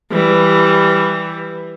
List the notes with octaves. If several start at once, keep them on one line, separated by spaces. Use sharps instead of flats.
E3 G3